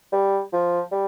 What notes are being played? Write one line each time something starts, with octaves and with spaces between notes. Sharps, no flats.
G3
F3
G3